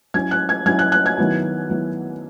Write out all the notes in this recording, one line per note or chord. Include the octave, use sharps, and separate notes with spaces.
F#3 C#4 E4 G#6
F#6
G#6
F#3 C#4 E4 G#6
F#6
F#6
G#6
D#3 F#3 B3 E4
D#3 F#3 B3 E4